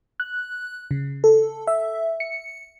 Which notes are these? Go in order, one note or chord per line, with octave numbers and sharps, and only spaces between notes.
F#6
C#3
A4
E5
C#7